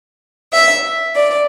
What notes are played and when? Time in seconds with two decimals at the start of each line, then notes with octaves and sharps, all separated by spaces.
0.53 E5
1.16 D5